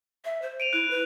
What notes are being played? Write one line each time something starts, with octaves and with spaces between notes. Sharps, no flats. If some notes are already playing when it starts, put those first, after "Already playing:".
E5
C5
D7 D#7 F7
E4 F#6 D7
B4